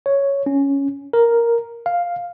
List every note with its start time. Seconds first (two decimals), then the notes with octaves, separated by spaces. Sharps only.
0.06 C#5
0.46 C#4
1.13 A#4
1.86 F5